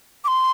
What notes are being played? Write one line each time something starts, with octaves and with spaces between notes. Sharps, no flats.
D6
C6